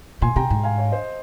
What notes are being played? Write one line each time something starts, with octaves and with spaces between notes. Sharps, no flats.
A#2 G#5 C6
C3 G5 A#5
G#2
F5 G#5
C#5 F5
C5 D#5